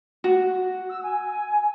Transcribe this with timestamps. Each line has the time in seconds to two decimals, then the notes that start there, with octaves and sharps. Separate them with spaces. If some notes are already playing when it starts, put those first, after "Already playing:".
0.24 F#4
0.89 E6
1.03 G#5